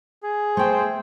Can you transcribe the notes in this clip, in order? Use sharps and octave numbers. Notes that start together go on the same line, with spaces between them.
G#4
A3 C5 G5